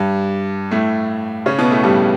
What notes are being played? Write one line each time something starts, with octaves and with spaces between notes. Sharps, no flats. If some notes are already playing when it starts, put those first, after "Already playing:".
Already playing: G2 G3
A2 A3
C#3 C#4
B2 B3
A2 A3
G2 G3